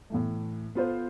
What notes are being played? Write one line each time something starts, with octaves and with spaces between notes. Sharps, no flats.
A2 E3 A3
B3 F4 A4 C5